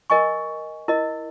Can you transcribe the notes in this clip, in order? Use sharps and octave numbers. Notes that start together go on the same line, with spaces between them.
A#4 D#5 G#5 C#6
E4 A#4 D#5